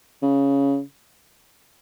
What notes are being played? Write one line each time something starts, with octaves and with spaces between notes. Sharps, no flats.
C#3